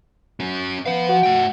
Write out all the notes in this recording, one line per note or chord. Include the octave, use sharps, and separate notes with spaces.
C#4 F#4
F3 B3 F5
F#4
A3 G5